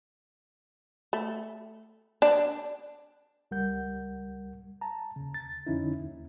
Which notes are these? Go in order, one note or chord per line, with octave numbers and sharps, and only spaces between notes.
A3
D4
C#2 G3 A#4 F#5 G6
A5 A#5
D#2 C#3
A6
F2 D3 C#4 D#4 E4
D#2